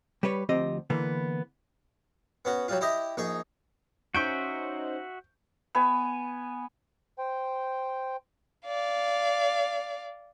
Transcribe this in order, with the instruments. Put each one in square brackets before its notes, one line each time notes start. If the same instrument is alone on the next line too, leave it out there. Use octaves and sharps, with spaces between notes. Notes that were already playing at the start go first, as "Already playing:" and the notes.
[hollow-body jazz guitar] G3 G4 B4 C#5
D2 F3 C4 G4 D#5
D3 E3 A#3 B3
[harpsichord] B3 C#4 F#4
F#3 G3 F4
E4 G4 D#5 E5
A#1 D#4 G#4 C#6
[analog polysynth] C#4 D#4 C5 [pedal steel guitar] F#4 E5 [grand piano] C#6 G6 D7
[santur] B3 G#5
[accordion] C5 G5
[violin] D5 F5